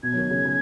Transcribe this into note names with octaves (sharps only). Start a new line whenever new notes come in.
B2 G#6
F#3
D#3
C#3
C#3